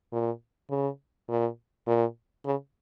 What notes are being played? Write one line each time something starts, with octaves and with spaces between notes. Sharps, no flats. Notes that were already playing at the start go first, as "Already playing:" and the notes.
A#2
C#3
A#2
A#2
C#3